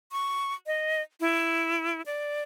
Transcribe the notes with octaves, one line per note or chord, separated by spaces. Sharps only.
C#6
D#5
E4
D5